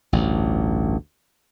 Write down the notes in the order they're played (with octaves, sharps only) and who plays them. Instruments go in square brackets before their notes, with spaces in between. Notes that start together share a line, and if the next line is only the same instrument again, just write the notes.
[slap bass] A1 D2 G2